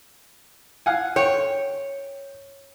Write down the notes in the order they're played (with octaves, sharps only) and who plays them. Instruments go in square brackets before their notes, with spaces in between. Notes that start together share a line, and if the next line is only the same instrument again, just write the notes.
[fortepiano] F5 F#5 G#5
[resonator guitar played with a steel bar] C#5 [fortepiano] G5